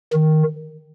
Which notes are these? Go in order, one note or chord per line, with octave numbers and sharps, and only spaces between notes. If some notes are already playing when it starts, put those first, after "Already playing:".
D#3